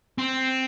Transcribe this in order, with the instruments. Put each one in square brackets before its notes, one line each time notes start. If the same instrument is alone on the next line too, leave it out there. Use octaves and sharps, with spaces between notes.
[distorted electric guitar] C4